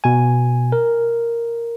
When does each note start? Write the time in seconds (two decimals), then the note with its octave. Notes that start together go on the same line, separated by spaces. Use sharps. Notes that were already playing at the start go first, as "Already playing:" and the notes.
0.04 B2 G#5
0.72 A#4